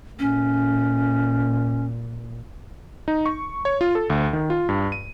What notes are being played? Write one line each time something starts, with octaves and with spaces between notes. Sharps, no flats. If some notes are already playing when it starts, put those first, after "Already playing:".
A#2 C#4
D#4
C#6
C#5
F4
A4
D2
D#3
F4
G2
D#7